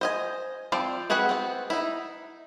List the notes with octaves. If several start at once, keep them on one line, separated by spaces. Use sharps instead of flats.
C5 D#5 G#5
F3 C4 C5 D5
C4 F#4 G#4 B4 F#5
B3 C4
D#4 E4